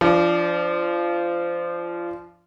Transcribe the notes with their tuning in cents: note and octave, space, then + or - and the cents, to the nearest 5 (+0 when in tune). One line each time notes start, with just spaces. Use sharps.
F3 -20 D4 +0